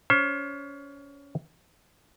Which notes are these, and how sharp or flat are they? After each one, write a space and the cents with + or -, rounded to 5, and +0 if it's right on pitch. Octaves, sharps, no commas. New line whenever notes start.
C#4 +30 C5 +35